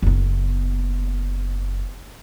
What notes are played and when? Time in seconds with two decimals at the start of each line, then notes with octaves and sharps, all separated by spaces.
0.02 F#1 B3